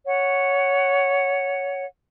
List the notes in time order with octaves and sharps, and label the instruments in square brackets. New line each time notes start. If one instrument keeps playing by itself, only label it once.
[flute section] C#5 F#5